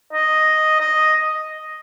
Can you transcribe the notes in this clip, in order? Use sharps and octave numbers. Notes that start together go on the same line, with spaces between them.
D#5
D#5